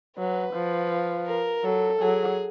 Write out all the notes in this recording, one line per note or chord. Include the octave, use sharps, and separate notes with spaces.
F#3 B4
F3
A#4
F#3 A4
F#3 G#4